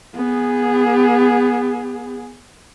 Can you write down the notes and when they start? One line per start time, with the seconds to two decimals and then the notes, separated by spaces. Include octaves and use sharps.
0.16 B3 G#4